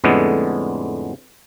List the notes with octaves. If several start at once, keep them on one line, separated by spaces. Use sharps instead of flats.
F2 A2 D3 G#3 B3